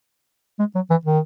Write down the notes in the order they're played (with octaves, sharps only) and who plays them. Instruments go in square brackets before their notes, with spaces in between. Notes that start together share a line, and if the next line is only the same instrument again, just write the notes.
[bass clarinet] G#3
F#3
E3
D#3